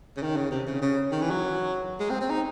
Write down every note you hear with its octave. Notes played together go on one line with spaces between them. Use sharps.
C#3
D#3
C#3
C3
C#3
C#3
D#3
E3
F#3
G#3
C4
C4
D#4